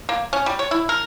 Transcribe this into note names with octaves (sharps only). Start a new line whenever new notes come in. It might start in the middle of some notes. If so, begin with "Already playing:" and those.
A#3
C#4
G3
C#5
E4
A#4